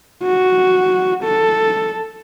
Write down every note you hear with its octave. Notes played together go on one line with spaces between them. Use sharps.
F#4
A4